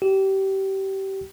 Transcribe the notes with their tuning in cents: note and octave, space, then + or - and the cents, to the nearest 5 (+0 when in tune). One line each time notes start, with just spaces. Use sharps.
G4 -25